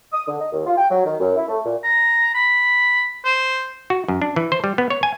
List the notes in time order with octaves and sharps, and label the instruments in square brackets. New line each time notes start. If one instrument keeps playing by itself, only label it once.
[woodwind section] D#6
D3
D#5
D#2
F4
G5
F#3
D#3
F#2
E4
A3
A#2
[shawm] A#5
B5
C5
[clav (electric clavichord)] F#4
F#2
D4
E3
C5
G3
B3
C#5
G#5